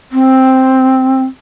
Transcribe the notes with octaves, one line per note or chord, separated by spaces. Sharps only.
C4